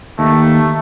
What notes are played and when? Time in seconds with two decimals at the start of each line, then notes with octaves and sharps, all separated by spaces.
0.19 D#2 A3